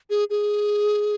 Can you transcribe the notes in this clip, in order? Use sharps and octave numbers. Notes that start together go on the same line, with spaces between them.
G#4
G#4